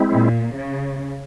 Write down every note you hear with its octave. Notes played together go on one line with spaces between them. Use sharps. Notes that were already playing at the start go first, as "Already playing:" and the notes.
Already playing: G#3 C4 E4
A#2
C#3